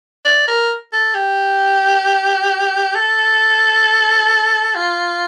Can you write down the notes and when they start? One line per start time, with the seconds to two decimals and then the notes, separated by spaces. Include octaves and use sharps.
0.25 D5
0.48 A#4
0.93 A4
1.14 G4
2.95 A4
4.75 F4